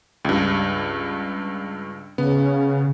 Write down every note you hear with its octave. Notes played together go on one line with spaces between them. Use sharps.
C#2 G2
C#3 B3